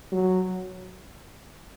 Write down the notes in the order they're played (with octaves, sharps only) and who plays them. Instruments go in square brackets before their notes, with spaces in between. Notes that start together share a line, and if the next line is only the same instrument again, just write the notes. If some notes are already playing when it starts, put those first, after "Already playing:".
[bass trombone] F#3